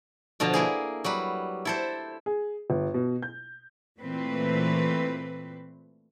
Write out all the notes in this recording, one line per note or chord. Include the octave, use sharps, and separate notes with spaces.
B2 D3 F3 A5 A#5
A#3 E4 G#4
F#3 G3 B4
E4 A4 C5
G#4
G1
B2
G6
A#2 E3 A3 C4 B4